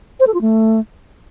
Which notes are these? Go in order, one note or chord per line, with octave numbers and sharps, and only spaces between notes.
C5
A4
F4
A3